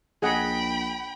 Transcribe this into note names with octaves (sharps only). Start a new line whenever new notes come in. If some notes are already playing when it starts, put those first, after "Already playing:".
A#1 G#4 D#5 F#5 G5 B5